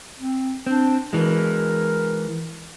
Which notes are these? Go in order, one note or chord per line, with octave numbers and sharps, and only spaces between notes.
C4
C4 D4
E3 G#3 A#4